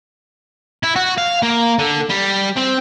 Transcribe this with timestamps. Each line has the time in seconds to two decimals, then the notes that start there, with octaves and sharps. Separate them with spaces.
0.83 E4
0.96 F#4
1.18 F5
1.43 A#3
1.79 D3
2.09 G3
2.56 C4